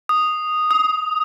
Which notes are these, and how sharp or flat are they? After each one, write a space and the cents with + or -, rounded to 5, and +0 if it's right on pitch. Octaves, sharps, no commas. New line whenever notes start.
D#6 -5
D#6 +25